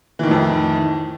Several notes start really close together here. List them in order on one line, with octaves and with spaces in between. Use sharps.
E3 D#3 A2 F2